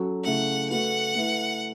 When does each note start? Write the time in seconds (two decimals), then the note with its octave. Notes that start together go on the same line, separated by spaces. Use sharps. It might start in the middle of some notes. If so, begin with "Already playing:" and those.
Already playing: F#3 C#4 F#4 A4
0.24 C#3 A3 E4 A4 F#5
0.70 A3 F#4 B4 F#5
1.15 A3 E4 B4